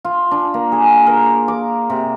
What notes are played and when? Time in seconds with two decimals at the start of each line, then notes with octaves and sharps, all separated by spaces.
0.05 F4
0.31 D4
0.54 A#3
0.72 G#4
1.07 A#4
1.48 D6
1.90 C3